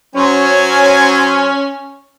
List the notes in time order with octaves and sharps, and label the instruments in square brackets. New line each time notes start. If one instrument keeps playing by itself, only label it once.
[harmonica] F#3 C5 G#5 [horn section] C#4